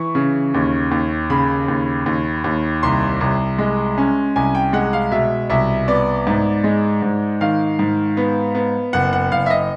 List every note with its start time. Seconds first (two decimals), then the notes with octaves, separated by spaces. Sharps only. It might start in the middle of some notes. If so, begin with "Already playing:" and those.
Already playing: E3 C#6
0.15 C#3
0.54 D#2
0.91 D#2
1.30 C#3 B5
1.68 D#2
2.06 D#2
2.44 D#2
2.83 C2 C6
3.21 C2
3.58 G#3
3.98 C#4
4.36 C2 G#5
4.55 G5
4.73 G#3 F#5
4.93 F5
5.11 B2 E5
5.50 C2 E5
5.88 B3 D5
6.27 G#2
6.64 G#3
7.02 G#2
7.41 D#3 F5
7.79 G#2
8.17 B3
8.55 B3
8.93 F#1 F#5
9.13 F#5
9.31 F#1 F5
9.46 E5
9.50 D#5